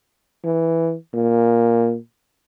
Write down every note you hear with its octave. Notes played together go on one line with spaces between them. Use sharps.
E3
A#2